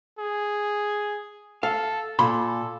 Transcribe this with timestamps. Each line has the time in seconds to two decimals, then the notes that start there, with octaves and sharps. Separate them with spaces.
0.19 G#4
1.63 A4 F5
2.19 A#2 A4 B5 C6